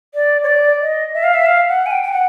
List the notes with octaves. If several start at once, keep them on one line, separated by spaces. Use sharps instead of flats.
D5
C#5
D5
D#5
E5
F5
E5
F5
F#5
G#5
G5
G5
F#5